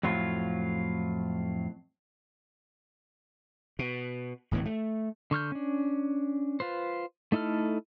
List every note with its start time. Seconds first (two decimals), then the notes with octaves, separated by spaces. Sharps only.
0.03 F2 A2 F#3 F4
3.79 B2
4.51 D1 A2 E3 B3
4.65 A3
5.31 D3 C#6 F6 G6
5.52 C#4 D4
6.60 F4 B4 C5
7.32 A3 D#4 E4 A4 F6